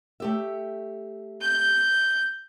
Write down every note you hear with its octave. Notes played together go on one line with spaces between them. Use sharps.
A3 G4 E5
G6